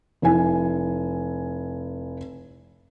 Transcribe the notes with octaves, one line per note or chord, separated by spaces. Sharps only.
F1 E4 G#5